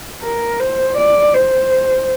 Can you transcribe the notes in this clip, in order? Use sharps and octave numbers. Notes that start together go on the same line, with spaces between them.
A#4
C5
D5
C5